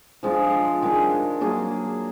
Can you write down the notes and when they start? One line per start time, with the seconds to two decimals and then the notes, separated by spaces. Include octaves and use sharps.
0.23 F3 G#3 D4 F4
0.82 D#3 G#3 D4
1.41 F#3 A#3 D4 G#4